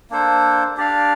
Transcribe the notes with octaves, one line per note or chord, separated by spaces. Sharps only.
A#3 D4 A4 C5
D4 G4 D5 F5